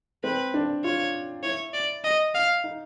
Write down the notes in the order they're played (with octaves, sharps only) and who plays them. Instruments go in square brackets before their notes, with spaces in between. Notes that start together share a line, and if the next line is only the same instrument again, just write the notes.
[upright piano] C4 [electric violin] B4
[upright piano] D4
[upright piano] F4 [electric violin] C#5
[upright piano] E4 [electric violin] C#5
[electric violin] D5
D#5
F5
[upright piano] D#4